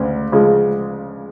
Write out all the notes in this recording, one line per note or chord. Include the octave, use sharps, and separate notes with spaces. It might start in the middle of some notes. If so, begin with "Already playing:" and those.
Already playing: D2 C#3
C#3 F3 G#3